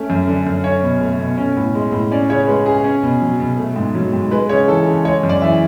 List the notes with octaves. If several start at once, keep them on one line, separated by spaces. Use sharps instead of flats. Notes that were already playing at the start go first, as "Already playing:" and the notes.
Already playing: A3 C#4
F#2
D3
F#2
C#4 C#5
B2
A3
B2
C#4
A2
G#3
A2
C#4 D5
C#3 C#5
G#3 B4
C#3 G#4
C#4
B2
F#3
B2
A3
G#2
F#3
G#2
G#3 B4
C#3 C#5
E3 A4
C#3
G#3 C#5
F#2
D5
E3 E5